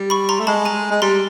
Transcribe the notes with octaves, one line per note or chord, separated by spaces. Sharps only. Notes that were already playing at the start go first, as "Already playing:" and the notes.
Already playing: G3
B5 C#6
A#5 C6
A3
G#3 A5 B5
G#5 A#5
G#3
G3 A#5 C6